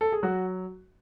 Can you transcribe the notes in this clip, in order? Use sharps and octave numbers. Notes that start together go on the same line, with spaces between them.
A4
G#4
F#3 F#4